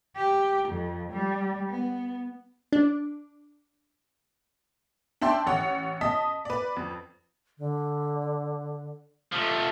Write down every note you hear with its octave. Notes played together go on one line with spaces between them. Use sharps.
G4
F2
G3
B3
D4
D4 E5 G5 A5 C6
A1 C#5 F#5
D#5 A5 D#6 B6
B4 D5
F2
D3
F3 A3